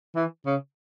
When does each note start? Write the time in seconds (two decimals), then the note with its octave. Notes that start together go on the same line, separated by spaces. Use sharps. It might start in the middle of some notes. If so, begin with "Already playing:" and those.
0.16 E3
0.46 C#3